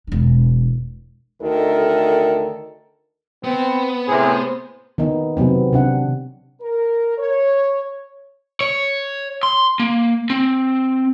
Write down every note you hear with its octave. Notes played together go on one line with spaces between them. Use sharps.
E1 D4
D2 D#3 A4 A#4
B3 C4
A2 C3 G#4 C5
D#3 B3 D#4
C3 F#3 B3 C4
C3 D4 F#5
A#4
C#5
C#5
C6
A#3
C4